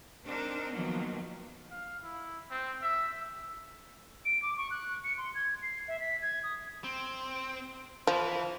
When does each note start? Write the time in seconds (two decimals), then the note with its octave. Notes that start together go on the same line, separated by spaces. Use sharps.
0.24 C4 D4 D#4 A#4
0.72 D#3 F3 F#3 A#3 B3
1.71 F5
2.03 E4
2.51 C4
2.82 E5
4.25 D7
4.42 D6
4.57 C#6
4.71 F#6
5.04 C#7
5.18 C6
5.35 G#6
5.62 C7
5.88 E5
6.00 B6
6.22 G#6
6.43 D#6
6.84 C4
8.07 E3 F3